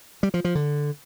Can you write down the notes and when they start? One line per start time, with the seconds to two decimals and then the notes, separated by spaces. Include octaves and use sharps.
0.23 G3
0.34 F3
0.45 F3
0.55 D3